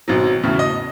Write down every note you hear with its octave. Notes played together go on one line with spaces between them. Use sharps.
G#1 B2 F#3
E2 A2 C#3
D#5